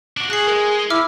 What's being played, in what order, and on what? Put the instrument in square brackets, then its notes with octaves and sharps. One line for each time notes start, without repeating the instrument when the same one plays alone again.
[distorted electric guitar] D4 F#4
[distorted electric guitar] F#4 [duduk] G#4 [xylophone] F#6 C7
[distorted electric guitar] G#3 [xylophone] A#4
[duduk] E4 [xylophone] E5 D6 F6